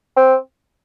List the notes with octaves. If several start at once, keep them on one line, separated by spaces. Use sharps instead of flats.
C4